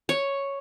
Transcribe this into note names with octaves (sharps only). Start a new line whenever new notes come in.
C#5